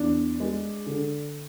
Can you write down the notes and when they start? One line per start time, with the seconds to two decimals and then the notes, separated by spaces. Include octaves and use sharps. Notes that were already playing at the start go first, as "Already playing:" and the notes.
Already playing: E2 D4
0.40 G#3
0.87 D3